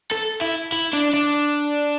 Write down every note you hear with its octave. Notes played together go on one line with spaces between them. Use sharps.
A4
E4
E4
D4
D4